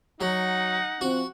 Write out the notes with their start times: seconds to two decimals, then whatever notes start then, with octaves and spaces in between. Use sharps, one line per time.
0.21 F#3 D#4 F#5
1.01 F3 C4 F#4